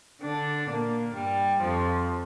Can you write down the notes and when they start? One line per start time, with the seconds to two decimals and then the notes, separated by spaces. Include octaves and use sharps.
0.21 D3 D4
0.68 A#2 A#3
1.14 G2 G3
1.61 F2 F3